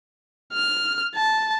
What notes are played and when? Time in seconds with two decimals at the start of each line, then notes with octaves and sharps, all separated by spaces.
0.54 F6
1.15 A5